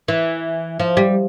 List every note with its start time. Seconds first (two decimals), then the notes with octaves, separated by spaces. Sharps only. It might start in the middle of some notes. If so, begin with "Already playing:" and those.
0.08 E3
0.80 F3
0.97 G3